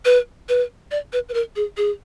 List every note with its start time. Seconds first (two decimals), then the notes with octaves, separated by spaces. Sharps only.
0.05 B4
0.49 B4
0.91 D5
1.13 B4
1.29 B4
1.34 A#4
1.56 G#4
1.77 G#4